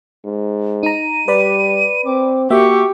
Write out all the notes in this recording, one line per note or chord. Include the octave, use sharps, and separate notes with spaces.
G#2
D#4 A#5 D#7
G3 B4 D5 B5
C4 D6
A#3 F#4 G4 E5 C#6